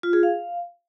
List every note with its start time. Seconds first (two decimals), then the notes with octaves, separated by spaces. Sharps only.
0.03 F4
0.13 G#4
0.23 F5